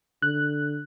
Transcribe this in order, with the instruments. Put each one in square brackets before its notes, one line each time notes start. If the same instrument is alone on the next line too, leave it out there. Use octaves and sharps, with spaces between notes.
[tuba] D3 [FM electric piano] F#6